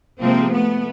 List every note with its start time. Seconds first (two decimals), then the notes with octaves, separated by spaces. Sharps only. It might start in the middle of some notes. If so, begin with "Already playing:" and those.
0.20 C3 F3 G#3 A#3 C4
0.51 A3 B3